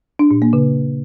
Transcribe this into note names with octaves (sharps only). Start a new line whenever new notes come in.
D4
A#2
A#3
C#3